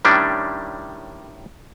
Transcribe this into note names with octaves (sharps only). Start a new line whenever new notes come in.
A2 D#3 G3 C#4 D4